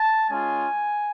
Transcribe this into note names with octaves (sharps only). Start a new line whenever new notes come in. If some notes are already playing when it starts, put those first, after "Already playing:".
Already playing: A5
G#3 C#4 F4 G#5